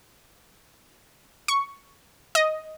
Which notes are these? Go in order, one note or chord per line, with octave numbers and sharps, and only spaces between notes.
C#6
D#5